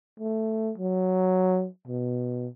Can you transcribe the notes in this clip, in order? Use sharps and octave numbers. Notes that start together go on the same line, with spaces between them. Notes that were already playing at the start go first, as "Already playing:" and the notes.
A3
F#3
B2